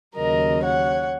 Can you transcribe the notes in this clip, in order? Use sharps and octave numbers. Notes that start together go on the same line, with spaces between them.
D#2 C#3 F#3 A#4 D#5
C#5 F#5